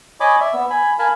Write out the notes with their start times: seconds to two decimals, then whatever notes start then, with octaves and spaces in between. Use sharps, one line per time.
0.20 C#5 D#5 G#5 B5 D6
0.40 D5 E5
0.53 B3 E6
0.70 G#5 B5
0.99 A#4 F5 G#5 A5 B5